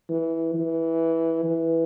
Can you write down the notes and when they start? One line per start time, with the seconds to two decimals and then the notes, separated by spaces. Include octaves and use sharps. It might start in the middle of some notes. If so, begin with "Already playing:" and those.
0.09 E3
0.54 E3
1.44 E3